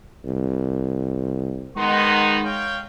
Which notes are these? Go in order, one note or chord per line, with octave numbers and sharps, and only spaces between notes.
C2
D#3 G#3 B3 D#4 F#5 C6
C#5 F5 G5